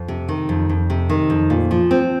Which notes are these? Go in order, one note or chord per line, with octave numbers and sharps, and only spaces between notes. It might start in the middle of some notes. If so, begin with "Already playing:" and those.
Already playing: F2
C3
D#3
F2
F2
C3
D#3
F2
A#2
F3
C4